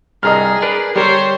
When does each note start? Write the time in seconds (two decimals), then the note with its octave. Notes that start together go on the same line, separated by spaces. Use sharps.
0.23 C2 G2 G#4 D#5 A#5 F6
0.62 D4 A#4 B4
0.96 D3 G3 A#4 C5 C#5